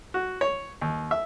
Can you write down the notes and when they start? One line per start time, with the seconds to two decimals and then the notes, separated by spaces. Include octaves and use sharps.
0.14 F#4
0.41 C#5
0.81 D#2
1.11 E5